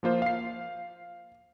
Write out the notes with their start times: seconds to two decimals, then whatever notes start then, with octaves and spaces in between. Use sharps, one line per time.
0.03 F3 A#3 F4 C5
0.22 F5 C7